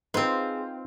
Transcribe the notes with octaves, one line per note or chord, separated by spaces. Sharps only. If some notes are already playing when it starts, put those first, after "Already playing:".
C4 D#4 F4 G#4 B4 C5